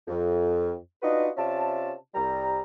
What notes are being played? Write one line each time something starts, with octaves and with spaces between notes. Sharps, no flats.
F2
D4 D#4 F4 F#4 B4 D#5
C3 C#4 F4 D5 E5 A5
C2 G3 A#5